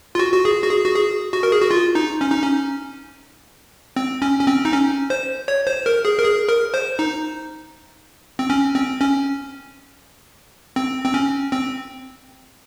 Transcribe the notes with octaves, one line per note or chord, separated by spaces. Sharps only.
F4
F#4
F#4
G#4
F#4
G#4
F#4
G#4
F#4
A#4
G#4
F#4
F4
D#4
C#4
D#4
C#4
C4
C#4
C#4
C4
D#4
C#4
C5
C#5
C5
A#4
G#4
A#4
G#4
A#4
C5
D#4
C4
C#4
C4
C#4
C4
C4
C#4
C4